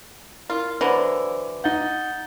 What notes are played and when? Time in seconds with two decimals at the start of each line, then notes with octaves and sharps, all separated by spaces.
0.50 E4 F4 A#4
0.81 D3 E3 F#3 C5
1.64 D#4 F#5 G6 A6 G7